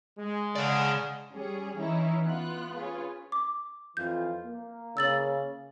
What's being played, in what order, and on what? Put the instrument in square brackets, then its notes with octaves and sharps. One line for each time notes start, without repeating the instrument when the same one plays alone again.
[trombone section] G#3
[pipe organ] C#3 [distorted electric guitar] D5 F#5
[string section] G3 C#4 G#4
E3 C#4 D#4 E4
B3 F4 F#6
C#4 F4 G#4 B4
[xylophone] D6
[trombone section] F2 E3 F4 [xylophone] G6
[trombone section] A#3
[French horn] C#3 [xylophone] E6 A6 F#7